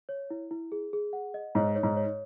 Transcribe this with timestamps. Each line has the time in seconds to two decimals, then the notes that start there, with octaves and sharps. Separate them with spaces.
0.09 C#5
0.30 E4
0.51 E4
0.72 G#4
0.93 G#4
1.13 F#5
1.34 D#5
1.55 G#2 C#5
1.76 C#5
1.83 G#2
1.97 C#5